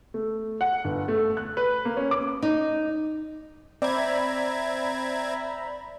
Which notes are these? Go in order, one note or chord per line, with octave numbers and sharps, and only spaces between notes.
A3
F#5
G1
A3
F#6
B4
A#3
C#4
D6
D#4
C4 D5 E5 A#5 B5 G#6